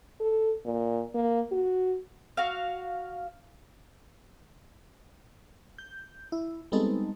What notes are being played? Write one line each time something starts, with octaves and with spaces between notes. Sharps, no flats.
A4
A#2
A#3
F#4
F#4 F5
G6
E4
G3 G#3 B3 C4 D#4 A4